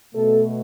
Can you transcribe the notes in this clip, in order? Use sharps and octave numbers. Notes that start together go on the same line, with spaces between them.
B2 A3 A4